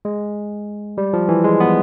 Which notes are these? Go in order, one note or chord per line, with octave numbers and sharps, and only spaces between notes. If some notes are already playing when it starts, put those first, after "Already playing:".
G#3
G3
F3
E3
G#3
B3